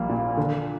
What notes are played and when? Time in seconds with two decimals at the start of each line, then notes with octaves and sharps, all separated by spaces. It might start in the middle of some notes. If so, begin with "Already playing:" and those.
Already playing: A#1 G3 A#3
0.09 A#2
0.37 D3